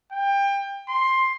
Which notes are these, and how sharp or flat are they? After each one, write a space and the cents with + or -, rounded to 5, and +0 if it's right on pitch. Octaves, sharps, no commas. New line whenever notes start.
G5 +25
C6 +10